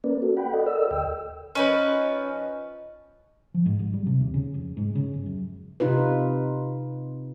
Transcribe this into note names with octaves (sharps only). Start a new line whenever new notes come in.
A#3 C#4 A#4 B4 D5
F#4 A4
F#5 G5 B5
A4 D5 D#5 F#5
A4 A#4 D5 D#5 E6
D2 G5 E6
F3 C#4 D#4 B4
F3
G#2
G#1
G3
C3
D#2
C#3
F1
G#2
C#3
G1
F#2
C3 D#4 F4 B4